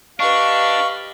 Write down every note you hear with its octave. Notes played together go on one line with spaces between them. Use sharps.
D4 G4 B4 D#5 F5 C#6